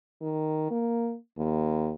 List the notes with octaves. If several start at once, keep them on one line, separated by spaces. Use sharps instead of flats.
D#3
A#3
D#2